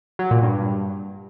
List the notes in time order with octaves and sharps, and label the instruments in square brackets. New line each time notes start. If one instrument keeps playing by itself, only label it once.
[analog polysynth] F#3
A#2
G2